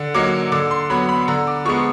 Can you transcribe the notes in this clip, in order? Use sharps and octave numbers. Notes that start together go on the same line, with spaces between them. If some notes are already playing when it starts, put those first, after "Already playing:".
Already playing: D3
F#3 A#3 D#4 D6
D3 D6
C6
F#3 B3 B5
B5
D3 A#5
D6
F3 G#3 B3 C#6